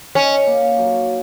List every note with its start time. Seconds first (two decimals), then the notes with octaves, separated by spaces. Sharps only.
0.15 C#4 D#4
0.47 A#3
0.79 F#3